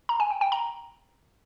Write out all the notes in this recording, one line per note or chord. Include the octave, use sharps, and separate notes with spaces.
A#5
G#5
G5
G5
A#5